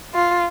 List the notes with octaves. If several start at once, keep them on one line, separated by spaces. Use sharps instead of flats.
F4